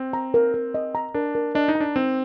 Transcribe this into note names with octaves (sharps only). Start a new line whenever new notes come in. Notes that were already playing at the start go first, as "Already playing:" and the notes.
Already playing: C4
A#5
A#4
A#4
D#5
A#5
D4 A#4
A#4
D4 D#5
D#4
A#5
D4
C4 D#4